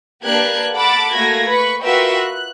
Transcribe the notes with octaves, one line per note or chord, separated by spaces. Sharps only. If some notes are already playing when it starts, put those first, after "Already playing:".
A#3 D4 G4 B4 F#6 G#6
A4 F#5 A5 B5 D6 A6
A3 A#3 F#4 G#6 A#6
B4 B5 C#6
F4 F#4 A#4 B4 E5 G5
F#6